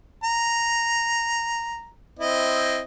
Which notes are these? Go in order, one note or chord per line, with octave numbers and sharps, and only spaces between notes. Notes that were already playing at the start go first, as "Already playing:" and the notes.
A#5
C4 E4 D#5